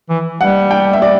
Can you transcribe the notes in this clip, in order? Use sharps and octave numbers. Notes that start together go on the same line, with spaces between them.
E3
G3 F#5
G5
E5
D5